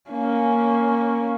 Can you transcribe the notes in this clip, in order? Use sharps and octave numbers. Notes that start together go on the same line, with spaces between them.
A#3 C#4